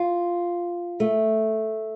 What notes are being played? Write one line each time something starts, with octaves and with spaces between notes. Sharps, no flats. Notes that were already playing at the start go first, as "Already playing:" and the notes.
Already playing: F4
A3